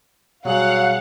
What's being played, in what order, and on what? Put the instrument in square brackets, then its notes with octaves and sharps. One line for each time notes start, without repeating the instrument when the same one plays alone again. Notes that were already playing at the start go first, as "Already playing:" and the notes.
[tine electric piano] B2 G3 G#4 [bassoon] F#3 [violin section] F5 F#5